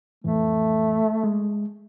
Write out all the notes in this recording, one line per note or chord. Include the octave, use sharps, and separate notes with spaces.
F2 A2 E3 A3
G#3